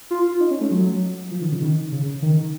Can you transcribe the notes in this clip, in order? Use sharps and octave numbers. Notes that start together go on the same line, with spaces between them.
F4
D#4
C#4
A3
F#3
F3
D#3
C#3
D#3
C#3
D#3